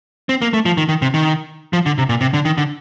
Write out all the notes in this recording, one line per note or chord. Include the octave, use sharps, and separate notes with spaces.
C4
A#3
A3
F3
D#3
D#3
C3
D#3
F3
D3
C3
A#2
C3
D3
D#3
D3